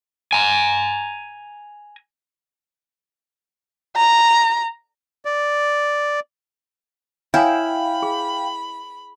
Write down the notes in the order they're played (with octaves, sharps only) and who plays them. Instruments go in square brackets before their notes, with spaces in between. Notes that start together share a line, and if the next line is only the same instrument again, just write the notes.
[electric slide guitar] G#5 A#5
[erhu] A#5
[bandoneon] D5
[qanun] E4 [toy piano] C#5 G#5 D#6 [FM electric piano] F5 G5 [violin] B5
[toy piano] G#4